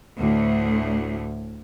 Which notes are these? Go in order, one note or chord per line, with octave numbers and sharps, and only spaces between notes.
D2 A2